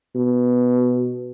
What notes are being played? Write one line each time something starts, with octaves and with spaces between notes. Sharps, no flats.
B2